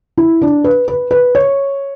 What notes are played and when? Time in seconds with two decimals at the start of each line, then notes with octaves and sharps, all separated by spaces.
0.18 E4
0.41 D4
0.64 B4
0.88 B4
1.11 B4
1.35 C#5